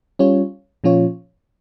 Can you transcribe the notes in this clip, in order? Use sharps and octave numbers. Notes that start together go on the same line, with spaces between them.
G3 C#4 F4 C#5
A#2 F3 C#4 F4 C#5